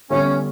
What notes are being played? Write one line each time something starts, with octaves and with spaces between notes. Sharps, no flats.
D3 G3 B3 C#4 E4